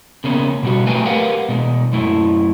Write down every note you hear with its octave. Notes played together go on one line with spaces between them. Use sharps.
C#3 A#3 B3 C#4
B2 G3 F#4
F#3 A3 B4 G5 G#5
G4 A#4 B4 F5 F#5
B2 G#3
F#2 A3 E4